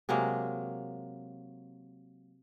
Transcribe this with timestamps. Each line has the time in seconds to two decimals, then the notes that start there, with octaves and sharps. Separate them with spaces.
0.09 C3 F#3 G#3 A#3